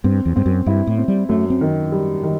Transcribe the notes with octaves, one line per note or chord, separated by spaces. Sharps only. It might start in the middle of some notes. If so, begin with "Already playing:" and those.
G2 C4
E2
G2 C4
F#2
G2 E4
A2
C4
G3
F#2 A3
C4
D#3
G3
D#3